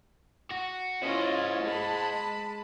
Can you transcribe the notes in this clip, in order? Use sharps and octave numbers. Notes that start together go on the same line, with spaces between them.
F#4
C#4 E4 F4 C5 D#5
G#3 A5 B5